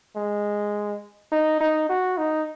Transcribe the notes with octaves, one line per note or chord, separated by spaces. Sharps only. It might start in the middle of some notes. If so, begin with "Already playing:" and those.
G#3
D#4
D#4
F#4
D#4